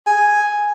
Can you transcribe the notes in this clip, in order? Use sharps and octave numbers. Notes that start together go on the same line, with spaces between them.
G#5